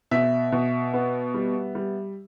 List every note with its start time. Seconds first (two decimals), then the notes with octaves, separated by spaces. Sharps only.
0.11 B2 E5
0.52 B2
0.94 B3
1.34 G3
1.75 G3